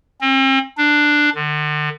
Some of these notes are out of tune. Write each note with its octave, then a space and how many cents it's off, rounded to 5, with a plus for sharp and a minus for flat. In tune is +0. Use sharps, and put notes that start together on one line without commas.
C4 +40
D4 +10
D3 +40